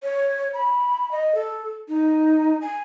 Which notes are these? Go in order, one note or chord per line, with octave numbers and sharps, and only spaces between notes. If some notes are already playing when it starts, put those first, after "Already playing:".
C#5
B5
D#5
A4
D#4
G#5